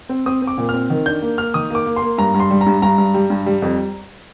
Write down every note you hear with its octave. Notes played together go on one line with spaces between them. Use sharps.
C4
C4 D#6
C4
D6
A#2
C4 F6
D#3
D4 G6
A#3
A#3 F6
D#3 D#6
A#3 D6
A#3
C6
A#3
G2 A#5
G2
C6
G3
A#5
G2
G2 A#5
G2
G3
G2
G3
F2